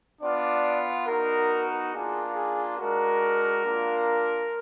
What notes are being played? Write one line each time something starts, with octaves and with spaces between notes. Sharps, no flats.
B3 D4 F4 D5
B3 D#4 F#4 A#4
A#3 D4 F4 G#4
G#4
G#3 D4 F#4 A#4
A#3 D4 F4